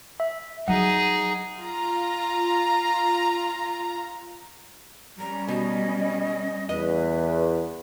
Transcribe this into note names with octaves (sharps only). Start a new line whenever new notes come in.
E5
F#3 D#4 G#4 F#5
F4 A#5
G3 C#4 A#5
B2 D#5
E2 B4 D#5